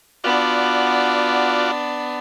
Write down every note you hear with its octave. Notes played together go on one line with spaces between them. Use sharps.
B3 D4 F4 F#4 D5